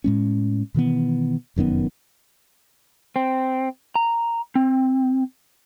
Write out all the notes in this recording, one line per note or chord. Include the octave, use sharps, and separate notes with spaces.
A2 G#3 C#4
B2 D#3 E3 B3
F1 F#2 D#3 B3
C4
A#5
C4